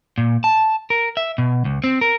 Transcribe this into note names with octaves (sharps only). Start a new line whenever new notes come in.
A#2
A5
A#4
E5
B2
C#2
C4
A#4